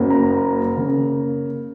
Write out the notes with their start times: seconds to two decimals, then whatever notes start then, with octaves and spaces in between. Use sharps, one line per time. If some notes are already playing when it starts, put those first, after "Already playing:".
Already playing: F#1 F#2 F#3 A#3
0.10 A#5
0.77 C#3 A#3